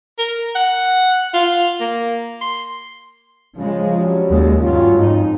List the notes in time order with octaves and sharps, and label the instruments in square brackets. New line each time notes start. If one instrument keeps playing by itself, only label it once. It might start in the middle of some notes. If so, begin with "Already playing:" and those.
[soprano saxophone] A#4
F#5
F4
A#3
C6
[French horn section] C#3 [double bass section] F3 G#3
[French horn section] F#3 G3 C#4
[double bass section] D#2 G#3
[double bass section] G2 [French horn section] F#3 C#4 F4
[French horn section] F2 D#4 [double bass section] G#2